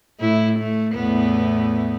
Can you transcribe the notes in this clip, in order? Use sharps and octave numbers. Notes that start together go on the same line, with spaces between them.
A2 E4
A3
E2 A2 B3